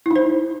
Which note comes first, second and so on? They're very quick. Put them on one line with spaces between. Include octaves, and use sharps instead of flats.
E4 D#4 C5